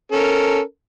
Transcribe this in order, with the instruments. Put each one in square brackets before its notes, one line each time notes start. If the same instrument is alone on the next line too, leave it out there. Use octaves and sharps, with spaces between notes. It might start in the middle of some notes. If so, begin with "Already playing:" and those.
[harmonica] C#4 A4 A#4